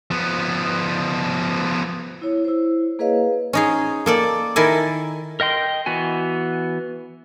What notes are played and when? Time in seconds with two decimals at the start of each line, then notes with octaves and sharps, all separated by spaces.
0.11 F3 B3
2.22 E4 C#5
2.45 E4 C5
2.99 A#3 G#4 B4 C#5 D#5 F5
3.53 C#4 D#4 G#4
4.06 A#3 A4 D5
4.56 D#3 E4 A4 A#4 G#5
5.40 A#4 D#5 G5 C6
5.86 E3 B3 F#4 G#5